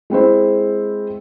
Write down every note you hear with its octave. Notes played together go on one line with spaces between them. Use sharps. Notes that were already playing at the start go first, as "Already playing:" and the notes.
G#3 C4 E4 C5